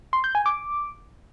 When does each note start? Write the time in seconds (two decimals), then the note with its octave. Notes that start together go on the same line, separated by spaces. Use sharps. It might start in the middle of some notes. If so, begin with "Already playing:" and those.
0.13 C6
0.24 G6
0.35 G#5
0.46 D6